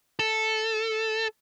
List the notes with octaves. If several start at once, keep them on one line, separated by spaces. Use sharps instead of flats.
A4